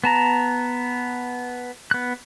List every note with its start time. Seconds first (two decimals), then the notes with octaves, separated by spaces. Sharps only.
0.04 B3 A5 A#5
1.91 B3 F#6